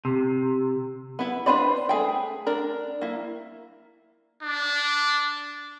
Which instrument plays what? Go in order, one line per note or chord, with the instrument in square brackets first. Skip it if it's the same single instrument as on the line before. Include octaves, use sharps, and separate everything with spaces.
[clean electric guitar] C3
[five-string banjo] B3 E4
D4 F4 B4 C5 D5
A3 G#4 G5
D4 A#4
A#3 E4
[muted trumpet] D4